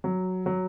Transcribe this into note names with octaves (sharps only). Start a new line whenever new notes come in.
F#3
F#3